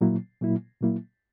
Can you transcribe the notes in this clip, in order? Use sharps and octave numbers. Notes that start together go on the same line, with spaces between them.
A#2 F#3 A#3 E4
A#2 F#3 A#3 E4
A#2 F#3 A#3 E4